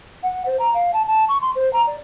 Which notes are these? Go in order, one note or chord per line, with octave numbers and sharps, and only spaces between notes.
F#5
C5
A#5
F5
A5
A5
C#6
C6
C5
A#5
D5